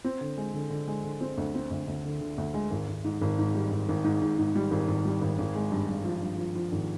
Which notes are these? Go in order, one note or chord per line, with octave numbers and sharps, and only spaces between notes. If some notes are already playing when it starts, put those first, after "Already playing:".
C4
D3
G#3
D3
D3
G#3
D3
C4
D2
C4
D2
D2
D3
D3
D2
G#3
G#1
G#1
G#2
G#1
G#2
G3
G#1
G#1
G#2
G#2
G#2
G3
G#1
G#1
G3
G#1
G#1
G#3
G2
G2
F3
G2
F3
F3
G#1